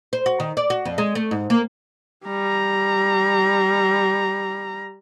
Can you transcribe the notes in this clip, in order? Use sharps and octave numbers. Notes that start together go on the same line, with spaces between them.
C5
F#4
D#3
D5
F#4
F2
G#3
A3
G#2
A#3
G3 A#5